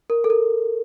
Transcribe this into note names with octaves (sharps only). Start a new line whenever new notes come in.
A#4
A4
A#4